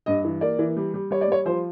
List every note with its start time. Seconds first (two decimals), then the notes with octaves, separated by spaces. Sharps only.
0.06 G2 D#5
0.24 E3
0.41 A#3 D5
0.59 E3
0.77 G3
0.94 G3
1.11 G3 C#5
1.21 D5
1.28 G3 C#5
1.45 F3 C5